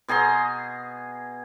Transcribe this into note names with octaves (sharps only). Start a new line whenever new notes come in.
B2 G#4 A#5 C6